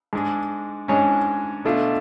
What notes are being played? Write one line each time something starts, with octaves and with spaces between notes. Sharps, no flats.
G#2 G#3 D4
G#2 G#3 C#4 D4 C#5
B2 A3 D4 F4